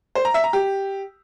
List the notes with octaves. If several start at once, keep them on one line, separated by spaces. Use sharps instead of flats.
C5
A#5
E5
A#5
G4